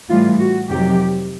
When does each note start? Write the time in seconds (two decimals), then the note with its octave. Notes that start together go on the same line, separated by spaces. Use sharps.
0.09 A2 E3 G3 F4
0.39 F#4
0.69 F2 C3 D#3 F#3 G4